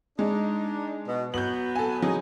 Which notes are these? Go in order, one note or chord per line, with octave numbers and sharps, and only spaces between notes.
G#3 D4 D#4
B2
F#3 B3 G6 F#7
A4 G#5
C#3 F#3 D#4 G#4